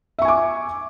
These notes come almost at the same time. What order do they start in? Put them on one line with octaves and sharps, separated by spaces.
E5 C#6 G#5 D6